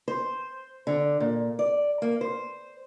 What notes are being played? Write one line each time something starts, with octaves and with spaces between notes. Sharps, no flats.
C5
D3
A#2
D5
A#3
C5